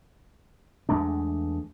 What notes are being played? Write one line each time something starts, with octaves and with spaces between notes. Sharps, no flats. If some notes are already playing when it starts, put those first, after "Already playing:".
E2 G#3 A3 D4